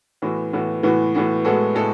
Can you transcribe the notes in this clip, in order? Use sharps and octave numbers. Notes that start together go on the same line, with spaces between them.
A2 E3 B3 F#4
A2 E3 B3 F#4
A2 E3 B3 F#4
A2 E3 B3 F#4
A2 G#3 B3 F#4 A4
A2 G#3 B3 F#4 A4